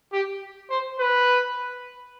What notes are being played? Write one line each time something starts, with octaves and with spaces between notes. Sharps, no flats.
G4
C5
B4